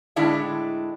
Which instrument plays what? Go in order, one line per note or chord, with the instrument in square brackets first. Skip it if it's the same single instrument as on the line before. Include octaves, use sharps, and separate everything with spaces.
[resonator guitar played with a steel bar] A2 D3 G#3 D4 E4 E5